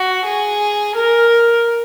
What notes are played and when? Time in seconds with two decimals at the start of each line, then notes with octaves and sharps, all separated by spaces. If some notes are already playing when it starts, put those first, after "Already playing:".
Already playing: F#4
0.25 G#4
0.95 A#4